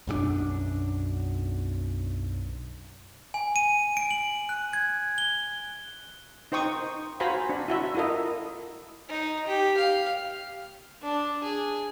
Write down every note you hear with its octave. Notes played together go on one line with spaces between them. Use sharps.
B1 F#2 F#3 D4
G#5
D#7
D7
F#7
F#6
G#6
G7
D#4 C5 G5 C#6 D#6
F#4 C5 F5 G#5 A#5 B5
D4
E4 F#4 E5
E4 F4 A4 A#4 D#5
D#4
G4
F5
D4
G#4